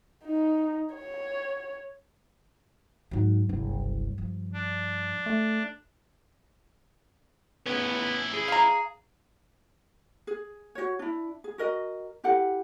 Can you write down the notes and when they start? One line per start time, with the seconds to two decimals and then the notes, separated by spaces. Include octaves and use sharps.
0.24 D#4
0.95 C#5
3.11 G#2 F#3
3.49 F#1 C2 G2
4.18 F3
4.53 D4
5.26 A3
7.66 B3 C#4 E4
8.34 G#4
8.48 F5 A#5
10.27 G#4
10.75 F#4 C#5
10.99 D4 E4
11.44 G#4
11.58 F#4 A#4 D#5
12.24 E4 G4 A4 F#5